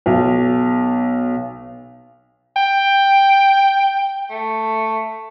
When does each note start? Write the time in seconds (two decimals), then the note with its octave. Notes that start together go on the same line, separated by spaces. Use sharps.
0.06 B1
2.56 G5
4.30 A3